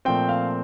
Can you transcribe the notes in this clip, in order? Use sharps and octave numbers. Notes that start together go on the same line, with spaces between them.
A#2 F3 A3 C4 G5
F5